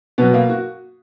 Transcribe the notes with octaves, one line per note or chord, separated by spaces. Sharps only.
B2 F#3 B3
A#3
F#4